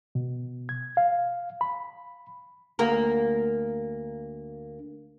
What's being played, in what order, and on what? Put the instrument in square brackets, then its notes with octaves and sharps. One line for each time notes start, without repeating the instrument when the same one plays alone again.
[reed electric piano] B2
G#6
F5
B5
[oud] D2 A#3 A#4